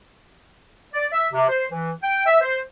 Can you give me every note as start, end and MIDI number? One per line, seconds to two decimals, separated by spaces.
0.94 1.06 74
1.12 1.27 76
1.33 1.47 48
1.49 1.65 72
1.71 1.90 52
2.02 2.24 79
2.26 2.37 76
2.41 2.59 72